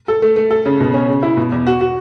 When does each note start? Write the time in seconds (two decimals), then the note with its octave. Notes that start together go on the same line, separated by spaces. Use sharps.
0.08 A4
0.22 A3
0.36 A3
0.50 A4
0.66 C#3
0.80 B2
0.94 C#4
1.09 C#3
1.23 E4
1.37 B2
1.52 E2
1.67 F#4
1.81 F#4